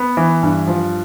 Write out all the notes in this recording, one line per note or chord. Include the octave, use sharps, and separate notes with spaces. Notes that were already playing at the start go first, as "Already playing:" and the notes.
Already playing: B3
E3
G2
F3